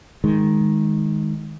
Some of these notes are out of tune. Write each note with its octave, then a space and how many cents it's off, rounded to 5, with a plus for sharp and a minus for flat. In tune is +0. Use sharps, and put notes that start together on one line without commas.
D#3 +5 G#3 +0